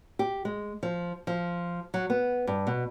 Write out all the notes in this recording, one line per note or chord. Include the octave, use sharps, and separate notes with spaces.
G4
G#3
F3
F3
F#3
B3
G2
B2